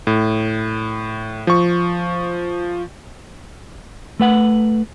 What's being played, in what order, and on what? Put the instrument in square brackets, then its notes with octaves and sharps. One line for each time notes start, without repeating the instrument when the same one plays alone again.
[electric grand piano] A2
F3 C#6
[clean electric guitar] A3 B4 F#5